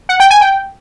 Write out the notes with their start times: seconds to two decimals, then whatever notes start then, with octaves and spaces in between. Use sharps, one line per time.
0.09 F#5
0.20 G5
0.30 G#5
0.41 G5